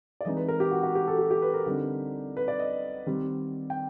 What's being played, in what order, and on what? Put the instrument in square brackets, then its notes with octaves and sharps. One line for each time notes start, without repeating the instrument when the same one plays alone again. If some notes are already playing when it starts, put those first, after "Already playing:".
[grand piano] D5
E3 G#3 C4 D#4 D#5
B4
A#4
G4
F#4
F#4
G4
A4
G4
G4
B4
A#4
D3 G3 C4 D#4
B4
D5
D#5
D#3 G3 C4
G5